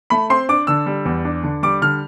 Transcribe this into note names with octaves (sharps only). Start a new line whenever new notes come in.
A3 B5
C4 C6
D4 D6
D3 E6
G3
E2
D4
D3
G3 D6
D3 F6